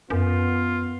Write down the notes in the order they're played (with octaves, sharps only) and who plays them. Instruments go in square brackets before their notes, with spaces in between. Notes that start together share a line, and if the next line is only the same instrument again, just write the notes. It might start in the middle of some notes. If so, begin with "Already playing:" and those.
[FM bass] F#2 [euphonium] B3 [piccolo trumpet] F4